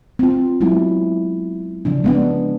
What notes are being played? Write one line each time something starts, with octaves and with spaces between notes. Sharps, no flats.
C4 F4
F#3 G#3 B3 E4
C#3 F3 D4
G#3 B3 D4